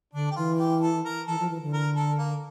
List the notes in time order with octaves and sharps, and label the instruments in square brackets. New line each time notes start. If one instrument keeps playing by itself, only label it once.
[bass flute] D3 [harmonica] D4
[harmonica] G4
[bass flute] E3 [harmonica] F4
[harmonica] G4
A4
A#4
[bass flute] E3 [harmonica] A4
[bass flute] F3
E3
D3
[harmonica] A#4
A4
A#3